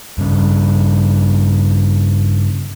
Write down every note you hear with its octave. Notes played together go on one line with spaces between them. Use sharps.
G2 C#3